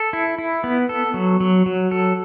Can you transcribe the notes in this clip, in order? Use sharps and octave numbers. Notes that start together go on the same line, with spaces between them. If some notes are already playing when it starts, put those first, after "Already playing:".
Already playing: A4
E4
E4
B3
A4
F#3
F#3
F#3
A4